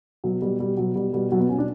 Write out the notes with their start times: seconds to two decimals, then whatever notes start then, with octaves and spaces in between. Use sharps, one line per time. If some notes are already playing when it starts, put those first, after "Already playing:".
0.24 B2 F#3
0.42 B2 G3
0.59 B2 G3
0.77 B2 F#3
0.95 B2 G3
1.13 B2 G3
1.32 B2 F#3
1.40 B3
1.49 B2 C#4
1.58 D4